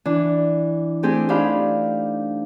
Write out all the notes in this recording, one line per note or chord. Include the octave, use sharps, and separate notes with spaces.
E3 D4
A3 C4 G4 G#4
D4 D#4 G4 F5 B5